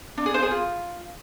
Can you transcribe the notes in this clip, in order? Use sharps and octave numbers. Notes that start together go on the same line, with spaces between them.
D4
G#4
C5
G#4
F4